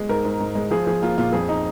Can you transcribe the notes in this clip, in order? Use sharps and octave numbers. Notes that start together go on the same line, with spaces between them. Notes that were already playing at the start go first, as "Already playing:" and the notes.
Already playing: G#3
G#2 A#4
G#2
G#2
G#3
F3 G#4
F3 G#4
A#3 F4
A#2 F4
F2 G#4
D#4